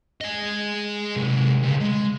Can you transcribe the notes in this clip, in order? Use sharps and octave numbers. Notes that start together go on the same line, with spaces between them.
G#4 D#5
C3 G#3
C#2
G#3